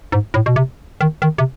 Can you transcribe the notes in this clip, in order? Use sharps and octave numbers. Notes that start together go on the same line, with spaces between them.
G#2
A2
B2
C3
D#3
D#3
C3